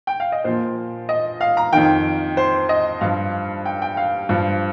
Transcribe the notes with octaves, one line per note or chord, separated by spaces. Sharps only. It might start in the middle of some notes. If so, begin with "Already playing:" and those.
G5
F5
D#5
A#2 F3 C5
D#5
F5
A#5
F2 D#3 G5
C5
D#5
G2 F3 F5
G5
G5
F5
G2 F3